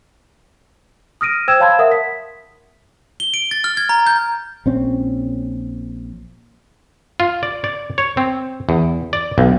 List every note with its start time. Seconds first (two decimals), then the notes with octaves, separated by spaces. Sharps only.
1.21 D#6 F6 A#6 D7 D#7
1.48 C5 G5 E6 G#6 E7
1.60 C#5 F5 A5 B5 C6 G#6
1.79 A#4 E5 F#5 D#6
1.92 B6
3.20 G7
3.34 D7
3.51 A6
3.64 F6
3.77 G#6
3.89 A#5
4.07 G6
4.66 A#1 C4 C#4
7.20 F4
7.43 D5
7.64 D5
7.98 C#5
8.17 C4
8.69 E2
9.13 D5
9.38 B1